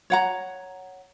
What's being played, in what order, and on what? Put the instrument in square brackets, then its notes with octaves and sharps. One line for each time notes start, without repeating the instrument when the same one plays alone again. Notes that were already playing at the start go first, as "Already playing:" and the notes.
[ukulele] C#5 F#5 A#5